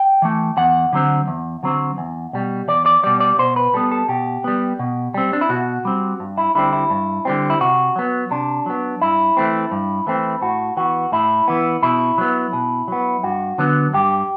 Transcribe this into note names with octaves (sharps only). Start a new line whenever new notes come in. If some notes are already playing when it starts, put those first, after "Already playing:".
Already playing: G5
E3 A3
E2 F#5
D3 F#3 C4
E2
D3 F#3 C4
E2
B2 G3
E2 D5
D5
B2 G3 D5
D5
B2 C5
B4
G3 B3 A4
A4
B2 G4
G3 B3
B2
G3 C4
D4
E4
B2 F#4
G3 C4
G2
E4
D3 G3 C4 E4
E4
G2
D3 G3 C4
E4
C3 F#4
F#3 B3
C3 D4
F#3 B3
G2 E4
E3 A3 C4
G2
E3 A3 C4
A2 F#4
E3 B3 F#4
A2 E4
E3 B3
B2 E4
F#3 B3
B2
F#3 B3
G2 F#4
D3 F#3 B3
G2 G4